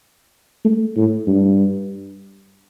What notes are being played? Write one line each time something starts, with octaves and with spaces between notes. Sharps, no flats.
A3
A2
G2